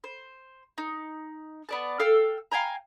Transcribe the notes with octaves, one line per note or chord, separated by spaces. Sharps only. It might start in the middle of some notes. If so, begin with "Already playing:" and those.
C5
D#4
B3 D5 A5
A4 F5 G5 E6
F5 G5 G#5 A#5